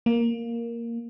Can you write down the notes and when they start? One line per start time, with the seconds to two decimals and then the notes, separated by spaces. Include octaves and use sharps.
0.06 A#3